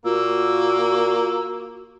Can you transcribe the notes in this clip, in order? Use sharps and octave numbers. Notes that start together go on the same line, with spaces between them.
A#2 A#3 F#4 E6